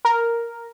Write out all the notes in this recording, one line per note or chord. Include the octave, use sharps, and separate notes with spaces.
A#4